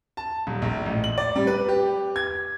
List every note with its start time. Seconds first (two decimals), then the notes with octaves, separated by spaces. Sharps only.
0.17 A5
0.47 D#1
0.62 A#1
0.86 A1
1.04 F#7
1.18 D5
1.36 G3
1.47 B4
1.69 G4
2.16 G#6